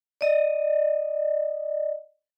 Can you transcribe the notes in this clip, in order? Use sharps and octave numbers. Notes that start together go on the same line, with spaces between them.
D5 D#5